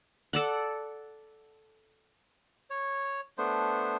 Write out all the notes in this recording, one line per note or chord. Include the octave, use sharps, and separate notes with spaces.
A4 D5 F#5
C#5
A3 B3 D4 C5